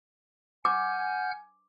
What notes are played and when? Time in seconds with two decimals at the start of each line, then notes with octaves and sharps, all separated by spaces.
0.65 F#5 G#5 D6 F6 G6